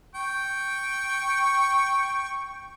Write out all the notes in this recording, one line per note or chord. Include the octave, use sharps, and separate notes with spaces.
G5 C#6